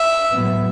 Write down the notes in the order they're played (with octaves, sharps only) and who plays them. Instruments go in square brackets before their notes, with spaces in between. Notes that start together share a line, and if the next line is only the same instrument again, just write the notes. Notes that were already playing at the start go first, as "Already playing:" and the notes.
Already playing: [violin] E5
[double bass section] A2 F#3 B3